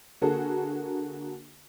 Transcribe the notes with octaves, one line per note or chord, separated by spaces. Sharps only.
D3 A#3 F#4 G#4 A4